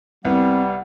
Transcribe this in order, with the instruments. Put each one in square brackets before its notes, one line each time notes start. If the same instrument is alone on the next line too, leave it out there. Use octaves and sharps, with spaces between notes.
[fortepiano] C2 B3 [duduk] G3 [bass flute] C4 [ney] F#5